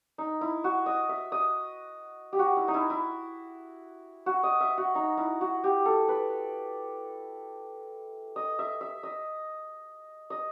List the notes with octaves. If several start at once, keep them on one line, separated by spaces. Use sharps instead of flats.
D#4
E4
F#4
D#5
E5
D#5
G4
F#4
E4
D#4
E4
E4
F#4
D#5
E5
F#4
D#4
E4
F#4
G4
A4
B4
D#5
E5
E5
D#5
D#5